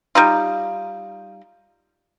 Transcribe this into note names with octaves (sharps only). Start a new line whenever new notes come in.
G3 D#4 F4